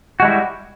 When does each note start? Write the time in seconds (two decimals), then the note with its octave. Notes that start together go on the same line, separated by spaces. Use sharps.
0.20 F#4
0.22 G#3
0.25 E4
0.27 G3